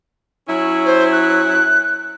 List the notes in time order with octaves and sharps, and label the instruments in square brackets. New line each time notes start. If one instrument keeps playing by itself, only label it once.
[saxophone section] F#3 C#4 E4
[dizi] C5
F#6